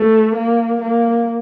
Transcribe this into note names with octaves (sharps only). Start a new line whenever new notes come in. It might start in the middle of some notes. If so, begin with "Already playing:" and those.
Already playing: A3
A#3
A#3